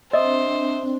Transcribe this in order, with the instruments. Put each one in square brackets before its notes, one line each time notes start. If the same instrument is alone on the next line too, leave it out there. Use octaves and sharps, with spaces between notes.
[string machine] C4 D4 [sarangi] C5 [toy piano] D#5 [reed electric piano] E5 D#6